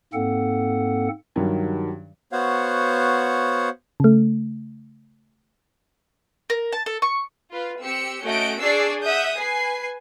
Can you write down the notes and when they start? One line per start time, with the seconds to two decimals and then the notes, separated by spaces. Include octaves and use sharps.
0.13 G#2 A#3 C4 A4 F#5
1.36 G2 D#3 F#3 G3
2.32 B3 F#4 C5 C#5 F5 F#5
4.00 C#3 A3
6.50 A#4
6.72 A5
6.86 A4
7.02 C#6
7.52 F4 B4
7.82 C4 G4 E6 C#7
8.22 A3 C#4 F#4 D#5 G6 D7
8.60 D4 G#4 D5 C#6 E6 C7
9.02 E5 F#5 D#6 G6
9.37 B4 G#5 C7